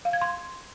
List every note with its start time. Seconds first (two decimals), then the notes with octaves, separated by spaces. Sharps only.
0.05 F5
0.13 G#6
0.21 C6